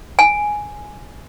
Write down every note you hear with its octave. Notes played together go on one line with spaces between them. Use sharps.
G#5